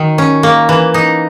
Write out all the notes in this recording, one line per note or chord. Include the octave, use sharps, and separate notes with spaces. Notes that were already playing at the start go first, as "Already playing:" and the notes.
Already playing: D#3 F#3
C#4
A#3
E3
D#4